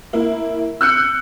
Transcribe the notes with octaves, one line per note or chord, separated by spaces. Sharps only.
A#3 E4
E6 F#6 G6 C#7